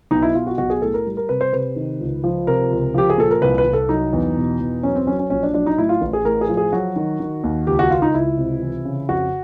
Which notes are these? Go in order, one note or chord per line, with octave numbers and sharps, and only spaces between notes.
B1 D#4
E4
B1 F4
F#4
B1 F#4
G#4
A2 A4
A#4
G3
A#4
C3 B4
C5
C3 B4
D#3
C#2
F3
C3 A#4
C#2
F3 G4
G#4
A#2 A4
A#4
C2 B4
B4
C2
A4
F#3 D#4
E2
B2
E2
F#3 C#4
C4
F#3 C#4
C#4
A#1 C#4
D4
F#3 D4
D#4
A2 E4
F4
A1
G#4
A2 A#4
G#4
F3
G#4
F#3 F#4
D#3
D#3
D#2
C#2 G4
F#4
C#2 F4
D#4
C#2 E4
C3
E3
C#3
F2 F#4